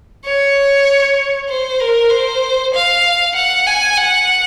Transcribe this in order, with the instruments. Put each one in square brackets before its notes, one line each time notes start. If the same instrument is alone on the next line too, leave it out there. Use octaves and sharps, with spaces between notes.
[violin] C#5
C5
A#4
C5
F5
F#5
G#5
F#5